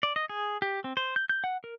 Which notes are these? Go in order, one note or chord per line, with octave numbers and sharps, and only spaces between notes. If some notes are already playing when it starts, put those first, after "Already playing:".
D5
D#5
G#4
G4
C4
C5
G6
G6
F#5
A#4